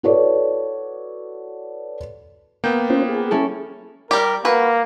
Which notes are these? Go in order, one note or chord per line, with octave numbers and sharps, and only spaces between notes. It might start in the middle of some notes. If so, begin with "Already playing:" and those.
E4 F#4 A4 B4 C#5 D5
A#3 B3 G5
C#4 F4 C5
G#4
C#4 E4 A4
G3 G4 A#4
A#3 F#4 B4